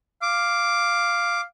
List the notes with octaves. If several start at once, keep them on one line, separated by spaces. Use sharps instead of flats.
F5 D6